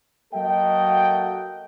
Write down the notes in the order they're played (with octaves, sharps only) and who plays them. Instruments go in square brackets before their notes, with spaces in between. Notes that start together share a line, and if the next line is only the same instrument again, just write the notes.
[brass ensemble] F#3 A#3 F#4 A4 D#5 G5